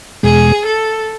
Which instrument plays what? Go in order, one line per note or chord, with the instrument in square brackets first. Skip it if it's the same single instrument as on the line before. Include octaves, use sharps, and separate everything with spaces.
[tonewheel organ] E2 B2 G#3 [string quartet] G#4
[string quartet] A4